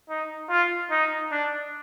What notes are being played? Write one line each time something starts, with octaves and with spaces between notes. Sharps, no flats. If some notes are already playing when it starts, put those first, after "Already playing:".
D#4
F4
D#4
D4